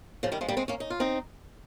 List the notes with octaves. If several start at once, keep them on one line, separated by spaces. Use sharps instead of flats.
C#3 F3
D#3 G3
F3 G#3
G3 A#3
G#3 C4
A#3 C#4
D#4
F4
C4 D#4